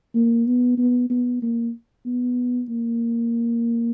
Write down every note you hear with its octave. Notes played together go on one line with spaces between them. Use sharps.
A#3
B3
B3
B3
A#3
B3
A#3